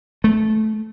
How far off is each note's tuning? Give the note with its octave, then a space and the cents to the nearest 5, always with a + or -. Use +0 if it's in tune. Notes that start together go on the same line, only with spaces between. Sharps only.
A3 -15